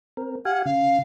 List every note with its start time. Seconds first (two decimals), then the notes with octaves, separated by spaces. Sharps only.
0.17 C4 A#4
0.45 G4 F5 F#5 G#5
0.65 C#3 F5